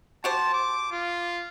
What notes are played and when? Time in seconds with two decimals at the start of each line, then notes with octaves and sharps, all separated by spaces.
0.24 F#4 G4 C5 A5
0.53 D6
0.92 F4